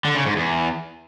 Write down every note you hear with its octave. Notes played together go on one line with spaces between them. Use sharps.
D3
C#3
G#2
E2